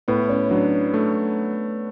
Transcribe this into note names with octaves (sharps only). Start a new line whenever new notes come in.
A2 B3
C#4
F#3 D4
A3